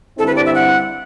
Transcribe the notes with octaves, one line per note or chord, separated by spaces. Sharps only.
G2 D3 G3 C4 E4 A4
B4
D5
E5
F#5